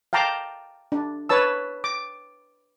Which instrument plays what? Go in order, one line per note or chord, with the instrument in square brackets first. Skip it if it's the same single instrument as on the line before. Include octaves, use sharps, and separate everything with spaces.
[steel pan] F5 G5 A5 A#5 D6
D4
B4 C#5 A5 E6
D6